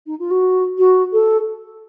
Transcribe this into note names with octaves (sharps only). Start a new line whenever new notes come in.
D#4
F4
F#4
F#4
A4